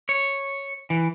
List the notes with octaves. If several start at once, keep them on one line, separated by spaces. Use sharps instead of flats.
C#5
E3